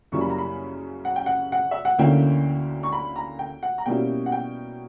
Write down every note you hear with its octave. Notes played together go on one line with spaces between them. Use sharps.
F#2 C#3 G3 A#3 E4 C#6
B5
A#5
B5
F#5
G5
F#5
F#5
E5
F#5
D2 D3 A#3 C#4 E4 G5
C#6
B5
A#5
G5
F#5
A#5
B2 G3 A#3 C#4 E4 G5
F#5
G5